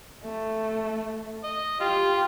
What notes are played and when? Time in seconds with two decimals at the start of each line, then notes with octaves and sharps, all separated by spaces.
0.24 A3
1.43 D#5
1.80 F4 G4